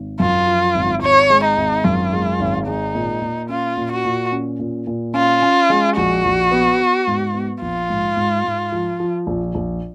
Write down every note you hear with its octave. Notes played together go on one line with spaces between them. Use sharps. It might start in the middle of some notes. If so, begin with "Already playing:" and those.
Already playing: G#1
F#2 F4
F3
G#1
G#1 C#5
G#3
D#4
G#1
F#2 F4
G#3
G#1
G#3 D#4
A#2
A#2
C#4 F4
A#2
F#4
A#2
C#4
A#2
A#2
C#4 F4
C#4
G#3
A#1 F#4
A#1
B3
B3
G#2
B3
A#1 F4
G#2
G#2
G#2
F3
F3
A#1
A#1